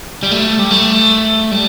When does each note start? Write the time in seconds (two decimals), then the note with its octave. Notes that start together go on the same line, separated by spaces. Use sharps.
0.23 G3
0.32 A3
0.59 G3
0.71 A3
1.51 G3